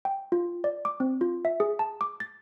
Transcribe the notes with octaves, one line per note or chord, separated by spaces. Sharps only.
G5
F4
D5
D6
C4
F4
E5
G#4
A5
D6
A6